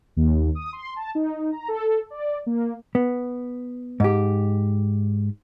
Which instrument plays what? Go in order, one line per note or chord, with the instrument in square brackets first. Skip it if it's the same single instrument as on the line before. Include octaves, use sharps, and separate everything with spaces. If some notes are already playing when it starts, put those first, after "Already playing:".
[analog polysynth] D#2
D#6
C6
A5
D#4
A#5
A4
D5
A#3
[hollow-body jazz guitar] B3
G#2 G4